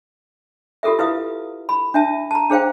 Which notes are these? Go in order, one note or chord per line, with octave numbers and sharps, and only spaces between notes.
F4 G4 A4 A#4 E5
E4 B4 F5 D#6
B5
D4 E5 A5
A5 A#5
D4 G#4 C5 F5 G5